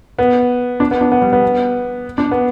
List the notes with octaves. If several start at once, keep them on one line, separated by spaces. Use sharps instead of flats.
B3
D4
B3
D4
B3
G3
B3
D4
B3